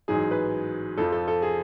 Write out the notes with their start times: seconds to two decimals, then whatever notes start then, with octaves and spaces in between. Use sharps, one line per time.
0.08 A1 G#2 F#3 G#4
0.31 B4
0.97 F2 F3 A4
1.12 A4
1.28 A4
1.42 G#4